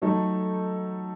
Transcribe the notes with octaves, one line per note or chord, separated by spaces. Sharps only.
F#3 A3 D#4 A4